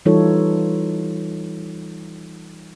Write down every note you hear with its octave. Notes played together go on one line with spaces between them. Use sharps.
E3 G3 D#4 F4 A4 C#5